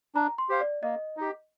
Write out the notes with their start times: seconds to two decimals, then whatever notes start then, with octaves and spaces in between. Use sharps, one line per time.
0.15 D4 A#5
0.38 C6
0.49 G4 C5 F5
0.60 D5
0.83 A#3 D#5
1.17 D#4 G4